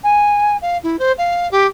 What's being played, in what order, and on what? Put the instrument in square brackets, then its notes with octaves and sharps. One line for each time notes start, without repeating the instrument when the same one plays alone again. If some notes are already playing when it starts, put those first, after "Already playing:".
[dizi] G#5
F5
E4
C5
F5
G4